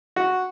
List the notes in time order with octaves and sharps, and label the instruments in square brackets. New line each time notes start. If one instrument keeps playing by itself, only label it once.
[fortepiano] F#4